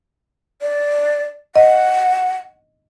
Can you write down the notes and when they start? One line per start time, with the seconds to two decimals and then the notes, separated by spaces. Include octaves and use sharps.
0.62 D5
1.56 D#5 F#5